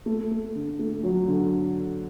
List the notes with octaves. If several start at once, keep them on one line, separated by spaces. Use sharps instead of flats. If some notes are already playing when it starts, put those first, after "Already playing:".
A3
A3
D3
A3
F#3
D3